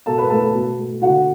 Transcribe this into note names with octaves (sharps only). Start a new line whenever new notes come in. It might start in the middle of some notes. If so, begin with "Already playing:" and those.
B2 A4 A5
B4 B5
A3 A4 A5
B2
A3
D3 F#4 F#5